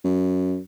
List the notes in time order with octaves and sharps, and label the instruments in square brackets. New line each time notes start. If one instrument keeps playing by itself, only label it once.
[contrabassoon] F#2